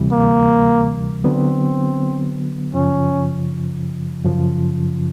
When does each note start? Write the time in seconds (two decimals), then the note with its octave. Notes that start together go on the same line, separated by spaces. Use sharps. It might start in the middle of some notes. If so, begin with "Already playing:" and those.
Already playing: D2 C3 E3 G3
0.12 A#3
1.24 D3 F#3 B3 C4
2.74 F#2 C#3 F3 C#4
4.25 F#2 C#3 F3